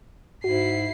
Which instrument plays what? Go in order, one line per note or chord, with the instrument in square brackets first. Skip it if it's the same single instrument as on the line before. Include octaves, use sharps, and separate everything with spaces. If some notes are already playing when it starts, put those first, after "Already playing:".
[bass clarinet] G#2 [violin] E4 C7 [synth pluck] F#4